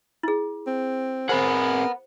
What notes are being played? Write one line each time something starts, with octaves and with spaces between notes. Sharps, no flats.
E4 G#4
C4
C4 G#4 A#4 C5 F#5 B5